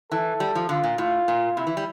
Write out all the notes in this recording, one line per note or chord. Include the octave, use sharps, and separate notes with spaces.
E3 A4
G3
F3
D3 F4
A#2
A2 F4
A#2
C3 E4
E3
G3